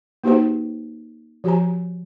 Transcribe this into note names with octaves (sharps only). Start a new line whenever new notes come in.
A#3 D#4 F#4 G4 B4 C5
F3 F#4 G4 C5 G#5 A#5